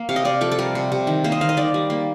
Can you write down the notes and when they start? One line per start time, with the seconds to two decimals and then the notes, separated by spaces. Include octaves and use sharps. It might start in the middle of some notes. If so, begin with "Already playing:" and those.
Already playing: A#3
0.09 C3 F5
0.16 D#5
0.25 C3 D5
0.41 F3 A4
0.52 A4
0.58 G3 A#4
0.75 C3
0.92 C3
1.07 D#3
1.24 A#3 C5
1.32 D#5
1.41 D#3 F5
1.49 D#5
1.57 D#3 D5
1.74 G3
1.90 A#3